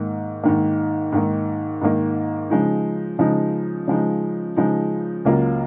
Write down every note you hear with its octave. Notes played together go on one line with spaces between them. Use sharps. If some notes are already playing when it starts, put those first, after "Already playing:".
Already playing: G#2 D#3 A#3
G#2 D#3 A#3
G#2 D#3 A#3
G#2 D#3 A#3
C#3 F3 G#3 D#4
C#3 F3 G#3 D#4
C#3 F3 G#3 D#4
C#3 F3 G#3 D#4
C#2 C#3 F#3 A#3 F4